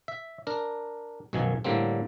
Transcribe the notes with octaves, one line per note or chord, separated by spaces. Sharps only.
E5
D4 A#4
B1 F#2 B2 D#3 F3 G#5
A2 D3 G3 A#3 C4